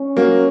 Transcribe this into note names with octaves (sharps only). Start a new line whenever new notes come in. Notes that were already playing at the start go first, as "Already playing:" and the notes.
Already playing: C#4
F#3 A#3